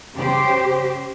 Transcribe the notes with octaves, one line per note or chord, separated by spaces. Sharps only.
C#3 G4 C5